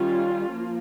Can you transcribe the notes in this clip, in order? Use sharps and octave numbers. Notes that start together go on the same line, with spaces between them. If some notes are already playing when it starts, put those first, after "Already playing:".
Already playing: D#3 G3 C#4 F4
F3 A#3